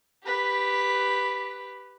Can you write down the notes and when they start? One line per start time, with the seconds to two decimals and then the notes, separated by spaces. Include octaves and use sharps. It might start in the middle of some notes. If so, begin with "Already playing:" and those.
0.24 G4 B4